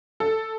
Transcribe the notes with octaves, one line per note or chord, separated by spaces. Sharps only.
A4